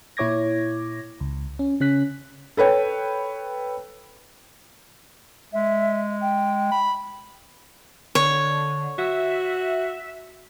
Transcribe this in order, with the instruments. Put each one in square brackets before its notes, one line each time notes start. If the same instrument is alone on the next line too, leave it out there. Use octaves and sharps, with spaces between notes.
[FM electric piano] A#2 E4 C#5 D6 G#6 A#6
C#2
C#4
C#3 C#4 F#6 B6
[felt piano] A4 B4 C#5 G5
[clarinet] G#3 [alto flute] E5
[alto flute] G5
[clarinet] B5
[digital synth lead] D3 [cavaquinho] C#5
[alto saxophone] F#4 [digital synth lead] E5